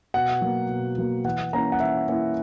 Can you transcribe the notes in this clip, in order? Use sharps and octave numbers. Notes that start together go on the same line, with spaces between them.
B2 F#5
F#3 A#3
B2
F#3 A#3
E3 F#5
A#3 C#4 E4 A#5
F#5
E3 E5
A#3 C#4 E4